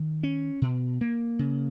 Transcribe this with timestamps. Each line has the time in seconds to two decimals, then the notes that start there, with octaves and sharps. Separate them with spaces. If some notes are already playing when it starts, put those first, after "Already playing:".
Already playing: D#3
0.23 C#4
0.62 B2
1.01 A#3
1.39 C#3